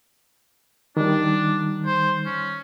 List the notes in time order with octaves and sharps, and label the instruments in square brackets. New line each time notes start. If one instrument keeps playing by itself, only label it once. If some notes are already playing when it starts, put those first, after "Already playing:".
[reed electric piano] D#3 G3 [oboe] D4
[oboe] C5
C#4